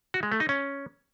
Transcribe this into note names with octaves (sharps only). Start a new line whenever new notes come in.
F#4
G#3
A3
D#4
C#4